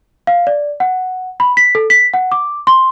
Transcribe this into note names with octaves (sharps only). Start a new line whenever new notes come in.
F5
D5
F#5
B5
B6
A4
B6
F#5
D6
C6